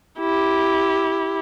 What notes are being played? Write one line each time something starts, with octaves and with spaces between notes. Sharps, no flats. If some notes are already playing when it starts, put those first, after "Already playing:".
E4 G4